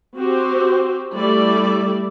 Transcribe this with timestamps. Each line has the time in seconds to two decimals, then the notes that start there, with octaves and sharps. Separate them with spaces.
0.16 C4 F#4 G4 C5
1.15 G3 A3 E4 D5